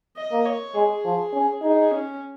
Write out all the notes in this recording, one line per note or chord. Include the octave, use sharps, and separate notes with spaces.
D#5
A#3
C#5
G#3 G#4
F3
C#4
D#4 G#4
C#4